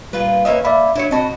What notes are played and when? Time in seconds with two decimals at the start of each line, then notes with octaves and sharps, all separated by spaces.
0.13 A#2 G3 F4 B4
0.45 A#3 C#4 B4 D#5 E5
0.65 A#3 D5 E5 B5
0.95 F#3 D4 E4 C#5 C#7
1.11 B2 C4 F#4 D#5 A5 B5